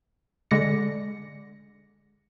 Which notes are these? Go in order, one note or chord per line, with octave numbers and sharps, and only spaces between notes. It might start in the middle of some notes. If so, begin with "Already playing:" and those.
D3 G#3 D5 A#6 C#7